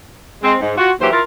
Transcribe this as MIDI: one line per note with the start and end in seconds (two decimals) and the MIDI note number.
0.43 0.55 56
0.43 0.55 60
0.61 0.74 44
0.77 0.91 65
0.77 0.91 66
1.00 1.07 39
1.00 1.07 52
1.00 1.07 54
1.00 1.07 67
1.00 1.07 72
1.11 1.21 64
1.11 1.21 65
1.11 1.21 70